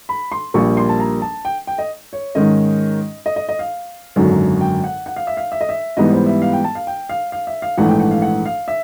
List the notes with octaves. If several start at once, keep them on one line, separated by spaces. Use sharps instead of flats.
B5
C6
A#1 A#2 G3 A#3 C#6
C6
A5
A#5
A5
G5
G5
D#5
C#5
G#2 D#3 G#3 C#4 D#5
D#5
D#5
D#5
F5
G#1 F#2 D3 F#3
G5
F#5
F#5
F5
E5
F5
E5
D#5
E5
G#2 E3 G3 B3 D#5
C5
E5
F5
G5
A5
F5
G5
F5
F5
E5
F5
A#1 G#2 E3 A3 F#5
G5
F#5
F5
F#5
F5
E5